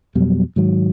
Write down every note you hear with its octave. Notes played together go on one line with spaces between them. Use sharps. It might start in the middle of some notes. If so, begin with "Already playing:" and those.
F2 B2 F#3 G3
G#2 D#3 F#3